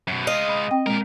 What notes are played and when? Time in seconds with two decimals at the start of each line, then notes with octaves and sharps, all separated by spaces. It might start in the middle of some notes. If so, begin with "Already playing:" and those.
0.08 F#2 B2
0.27 G#3 D#5 F5
0.49 B5
0.71 C4 G5
0.86 A#2 G#3 A#4